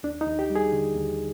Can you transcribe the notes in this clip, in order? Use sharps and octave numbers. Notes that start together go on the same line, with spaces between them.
D#2 D4
D#4
D#2
G4
G3
G#4
D3
D#2